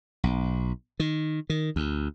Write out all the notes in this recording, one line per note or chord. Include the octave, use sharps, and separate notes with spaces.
B1
D#3
D#3
D2